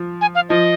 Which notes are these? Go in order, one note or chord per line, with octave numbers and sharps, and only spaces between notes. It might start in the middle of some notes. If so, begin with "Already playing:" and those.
Already playing: F3
G#5
F5
F3 D#5